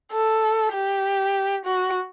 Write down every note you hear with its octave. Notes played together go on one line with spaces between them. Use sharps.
A4
G4
F#4